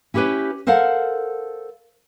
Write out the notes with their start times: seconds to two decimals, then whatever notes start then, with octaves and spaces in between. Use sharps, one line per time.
0.14 C#4 E4 G4 G#4 B4 C#5
0.67 A4 A#4 C5 F5 F#5 A5